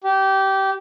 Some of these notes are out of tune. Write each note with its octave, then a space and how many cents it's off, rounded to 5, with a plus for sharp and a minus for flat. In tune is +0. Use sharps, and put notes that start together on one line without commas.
G4 -20